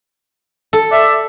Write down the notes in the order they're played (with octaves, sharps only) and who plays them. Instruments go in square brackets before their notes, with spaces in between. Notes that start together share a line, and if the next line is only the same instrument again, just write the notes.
[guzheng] A4
[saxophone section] D5 E5